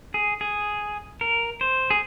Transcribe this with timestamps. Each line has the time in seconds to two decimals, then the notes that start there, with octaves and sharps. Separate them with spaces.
0.14 G#4
0.41 G#4
1.21 A#4
1.61 C5
1.90 G#4